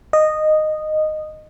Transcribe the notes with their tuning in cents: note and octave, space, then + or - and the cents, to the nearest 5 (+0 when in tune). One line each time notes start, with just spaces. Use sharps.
D#5 -10